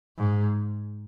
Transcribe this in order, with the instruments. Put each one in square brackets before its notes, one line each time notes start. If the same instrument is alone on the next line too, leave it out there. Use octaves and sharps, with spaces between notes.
[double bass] G#2